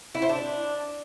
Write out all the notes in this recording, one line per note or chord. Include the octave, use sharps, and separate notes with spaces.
E4
C5
D4